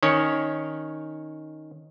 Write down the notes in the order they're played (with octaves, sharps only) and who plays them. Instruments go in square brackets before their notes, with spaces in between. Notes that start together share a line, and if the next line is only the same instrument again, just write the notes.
[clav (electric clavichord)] D#3 C#4 C#5